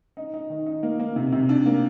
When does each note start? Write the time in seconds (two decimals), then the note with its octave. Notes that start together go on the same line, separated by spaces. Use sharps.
0.17 D#4
0.34 D#4
0.50 D#3
0.66 D#4
0.83 A#3
0.99 A#3
1.16 C3
1.32 C3
1.49 D4
1.65 A#3